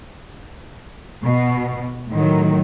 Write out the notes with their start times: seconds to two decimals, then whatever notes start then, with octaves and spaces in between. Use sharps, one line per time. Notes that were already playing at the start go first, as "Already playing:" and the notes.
1.24 B2
2.12 A2 D#3 F#3